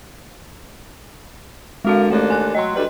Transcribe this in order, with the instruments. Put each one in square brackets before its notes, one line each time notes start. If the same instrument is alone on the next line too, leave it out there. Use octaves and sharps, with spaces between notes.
[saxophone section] D3 A#4 [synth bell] G#3 F#4 F5
[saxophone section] D#2 D4 A4 [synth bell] A3
[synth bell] G#5 F#6
[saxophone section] F#3 [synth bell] D#5 C6
[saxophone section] D2 G3 B4